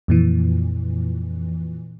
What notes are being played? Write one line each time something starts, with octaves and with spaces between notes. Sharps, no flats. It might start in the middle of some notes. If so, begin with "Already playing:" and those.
F2 A#2 E3